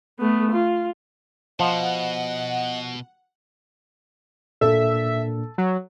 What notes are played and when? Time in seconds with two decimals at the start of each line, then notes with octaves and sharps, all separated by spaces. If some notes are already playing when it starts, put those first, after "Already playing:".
0.20 A3 B3
0.52 F4
1.60 B2 F3 D#5 F#5
4.61 A#2 A#3 D4 A4 E5
5.58 F#3